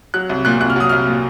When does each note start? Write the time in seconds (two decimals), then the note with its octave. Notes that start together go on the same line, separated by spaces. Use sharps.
0.14 F#3 F#6
0.29 C2
0.45 A#2 F#6
0.60 C2 F#6
0.70 F6
0.76 F#3 D#6
0.89 C2 F6
1.08 A#2